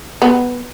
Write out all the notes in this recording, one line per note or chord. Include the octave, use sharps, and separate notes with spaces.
B3